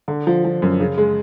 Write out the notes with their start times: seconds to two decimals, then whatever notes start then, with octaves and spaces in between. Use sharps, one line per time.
0.08 D3
0.27 F3
0.45 F3
0.62 F#2
0.80 C#3
0.98 G#3